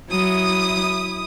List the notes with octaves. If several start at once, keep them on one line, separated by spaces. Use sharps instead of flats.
F#3 E4 D#6